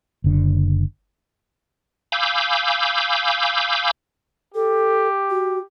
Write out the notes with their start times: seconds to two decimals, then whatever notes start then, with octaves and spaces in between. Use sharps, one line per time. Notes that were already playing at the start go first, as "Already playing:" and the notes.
0.24 F#1 D3
2.12 F5 G#5 B5 D6 E6 G6
4.54 G4 A4
5.30 F#4